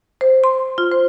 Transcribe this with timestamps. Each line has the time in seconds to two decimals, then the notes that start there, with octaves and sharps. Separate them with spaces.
0.21 C5
0.44 C6
0.78 F4
0.91 C5